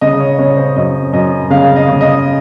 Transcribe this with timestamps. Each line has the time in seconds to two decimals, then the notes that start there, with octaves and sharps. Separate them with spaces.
0.01 C#3 D#5
0.20 C#5
0.39 C#3 C#5
0.57 C5
0.76 F#2 D#5
1.13 F#2 D#5
1.50 C#3 F5
1.76 D#5
1.88 C#3
2.01 D#5